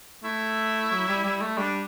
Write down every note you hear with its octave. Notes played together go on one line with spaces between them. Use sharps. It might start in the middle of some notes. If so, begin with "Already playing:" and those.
A3 E4
F#3
G3
G3
A3
G3 D4